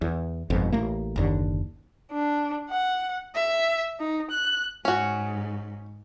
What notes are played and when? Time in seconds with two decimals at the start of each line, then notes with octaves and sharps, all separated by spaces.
0.02 E2
0.50 G1 F2 G#2 B2
0.72 A1 A3 A#3
1.16 F#1 D#2 D3
2.12 D4
2.70 F#5
3.35 E5
3.99 D#4
4.31 F#6
4.85 G#2 C#4 F#4